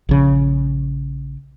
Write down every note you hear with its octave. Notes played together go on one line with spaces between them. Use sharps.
A#1 C#3